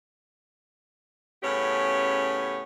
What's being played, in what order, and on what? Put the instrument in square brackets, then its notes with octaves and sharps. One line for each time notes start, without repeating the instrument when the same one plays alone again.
[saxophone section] A2 C#3 B3 C#4 G4 C#5